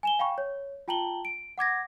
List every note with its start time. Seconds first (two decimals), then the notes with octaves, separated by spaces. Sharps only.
0.03 G#5 E7 G7
0.19 F5 G5 B5 C#6
0.38 C#5
0.88 F4 G5 A5 A#5 F#7 G7
1.25 D7
1.58 F#5 D6 G#6 A#6